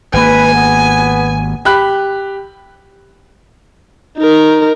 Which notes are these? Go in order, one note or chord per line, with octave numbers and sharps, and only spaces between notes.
G#1 A#3 B4 G#5
B3
G4 B5 F#6
D#4 A#4